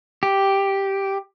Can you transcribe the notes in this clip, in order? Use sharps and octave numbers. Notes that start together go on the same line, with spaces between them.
G4